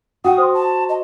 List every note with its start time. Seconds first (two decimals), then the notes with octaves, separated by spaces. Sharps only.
0.24 F#4 F#5 G5 D#6
0.38 C5 C6
0.54 A5
0.89 D#5